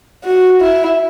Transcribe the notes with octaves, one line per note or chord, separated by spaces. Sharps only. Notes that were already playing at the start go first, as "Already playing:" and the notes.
F#4
E4